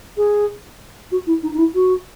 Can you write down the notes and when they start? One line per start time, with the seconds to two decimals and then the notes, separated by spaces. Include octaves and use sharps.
0.17 G#4
1.11 F#4
1.26 E4
1.42 D#4
1.53 D#4
1.58 E4
1.74 F#4